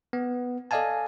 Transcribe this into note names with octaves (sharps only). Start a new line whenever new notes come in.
B3
A4 D5 D#5 F5 G#5 A5